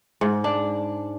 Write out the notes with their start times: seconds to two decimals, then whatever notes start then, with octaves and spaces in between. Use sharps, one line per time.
0.21 G#2
0.44 D4